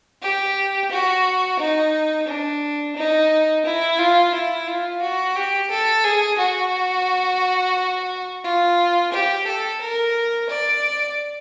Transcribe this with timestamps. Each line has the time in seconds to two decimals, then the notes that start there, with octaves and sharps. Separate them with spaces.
0.22 G4
0.91 F#4
1.59 D#4
2.28 D4
2.96 D#4
3.65 E4
3.99 F4
4.33 E4
4.67 F4
5.02 F#4
5.35 G4
5.70 A4
6.04 G#4
6.38 F#4
8.44 F4
9.12 G4
9.47 A4
9.81 A#4
10.50 D5